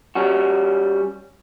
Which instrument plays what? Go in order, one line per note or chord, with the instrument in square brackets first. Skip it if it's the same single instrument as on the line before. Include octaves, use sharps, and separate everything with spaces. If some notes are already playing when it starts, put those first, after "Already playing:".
[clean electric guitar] G3 C#4 F#4